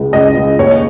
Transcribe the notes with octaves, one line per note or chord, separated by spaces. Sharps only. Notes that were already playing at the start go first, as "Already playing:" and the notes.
Already playing: C#2 C#3
C#2 D#5
C#2
D#2 C#5